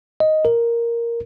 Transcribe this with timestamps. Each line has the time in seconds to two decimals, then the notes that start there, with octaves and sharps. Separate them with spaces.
0.20 D#5
0.45 A#4